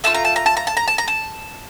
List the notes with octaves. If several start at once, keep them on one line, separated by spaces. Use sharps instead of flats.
A3 D4 F4 A5
A#5
A5
A#5
A5
A#5
A5
A#5
A5
A#5
A5